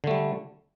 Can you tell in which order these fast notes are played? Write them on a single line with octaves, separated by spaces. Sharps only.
D3 A3 G3